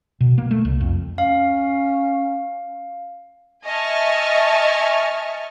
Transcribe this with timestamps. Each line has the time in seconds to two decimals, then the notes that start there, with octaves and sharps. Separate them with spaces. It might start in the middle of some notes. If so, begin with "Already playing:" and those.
0.21 B2
0.38 A#3
0.51 A3
0.65 C2
0.80 F2
1.18 C#4 F5
3.65 D#5 E5 G#5 A5 C#6 F6